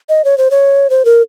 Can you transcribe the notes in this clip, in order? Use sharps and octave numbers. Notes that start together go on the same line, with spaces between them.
D#5
C#5
C5
C#5
C5
A#4